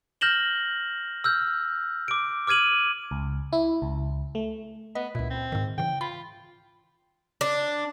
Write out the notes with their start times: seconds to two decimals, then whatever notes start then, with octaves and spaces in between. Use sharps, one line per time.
0.21 F6 G6 A#6 E7 F#7 G7
1.24 E6 F6 G6
2.08 D6 D7
2.47 D6 F6 G#6 D#7 F#7
3.11 C#2
3.53 E4
3.82 C#2
4.35 A3
4.95 B3 D#5
5.15 C#2 A#2 E4
5.30 C4
5.52 G#2 D#3
5.78 C#3 E3 G5
6.01 F4 B5
7.41 D4